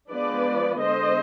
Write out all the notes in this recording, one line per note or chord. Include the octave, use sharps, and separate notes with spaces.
F3 G#3 B3 D4 B4 D5
D3 G#3 B3 C5 D#5